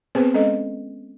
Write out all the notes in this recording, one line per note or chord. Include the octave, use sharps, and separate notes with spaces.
B3 C4 G#4 B4 C5
G#3 C#4 A4 D#5